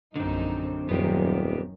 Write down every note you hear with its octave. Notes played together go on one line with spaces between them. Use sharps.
A#1 F#2 D3 C4 D#4
D#1 F#2 D#3 B3 C4 G4